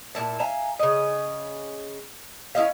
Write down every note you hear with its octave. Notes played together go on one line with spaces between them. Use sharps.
A#2 A#3 E4 A5
E5 F5 G#5 A#5
C#3 D#5
C#4 E4 D#5 F5